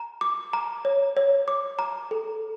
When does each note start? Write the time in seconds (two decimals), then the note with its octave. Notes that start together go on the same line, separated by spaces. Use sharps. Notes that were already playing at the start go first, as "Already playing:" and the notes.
Already playing: A#5
0.21 D6
0.53 A#5
0.85 C#5
1.17 C#5
1.48 D6
1.79 A#5
2.11 A4